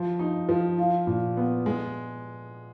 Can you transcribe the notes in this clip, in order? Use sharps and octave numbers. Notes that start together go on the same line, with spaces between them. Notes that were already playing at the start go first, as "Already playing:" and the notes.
Already playing: F3
D#4
F3
F4
A#2
B3
G#3